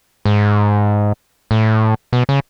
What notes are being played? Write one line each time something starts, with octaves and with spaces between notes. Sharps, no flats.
G#2
A2
B2
C#3